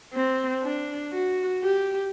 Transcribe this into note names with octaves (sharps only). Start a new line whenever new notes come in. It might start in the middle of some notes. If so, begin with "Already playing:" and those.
C4
D4
F#4
G4